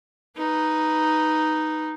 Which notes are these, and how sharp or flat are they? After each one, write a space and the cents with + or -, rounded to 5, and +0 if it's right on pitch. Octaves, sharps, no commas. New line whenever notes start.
D#4 +0 B4 +0